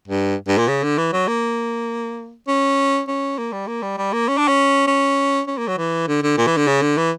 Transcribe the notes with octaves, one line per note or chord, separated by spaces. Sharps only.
G2
G2
A#2
C#3
D3
E3
F#3
A#3
C#4
C#4
A#3
G3
A#3
G3
G3
A#3
C#4
D4
C#4
C#4
C#4
A#3
F#3
E3
D3
D3
A#2
E3
D3
C#3
D3
E3